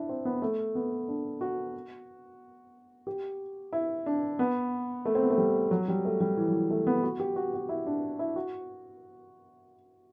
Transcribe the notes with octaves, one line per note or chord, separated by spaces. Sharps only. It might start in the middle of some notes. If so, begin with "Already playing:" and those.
Already playing: D4 E4
C4
B3
A3
B3
D4
F#4
G4
E4
D4
B3
A3
C4
B3
A3
G3
F#3
G3
A3
G3
E3
F#3
E3
A3
B3
F#4
G4
F#4
F#4
E4
D4
E4
F#4